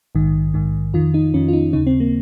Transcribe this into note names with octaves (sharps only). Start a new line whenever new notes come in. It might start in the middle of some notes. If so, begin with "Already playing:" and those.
A#1 G#2 D#3
A#1 G#2 D#3
F2 D#3 F4
D#4
F2 D#3 C#4
F4
D#4
D#2 C#3 D#4
C4
A#3